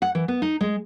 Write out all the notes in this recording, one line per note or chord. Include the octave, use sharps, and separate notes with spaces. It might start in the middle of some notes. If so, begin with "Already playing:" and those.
F#5
E3
B3
D#4
G#3